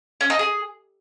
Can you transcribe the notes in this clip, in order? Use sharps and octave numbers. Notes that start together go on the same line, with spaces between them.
C#4
D#4
G#4